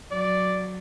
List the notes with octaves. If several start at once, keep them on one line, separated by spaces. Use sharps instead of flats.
F#3 D5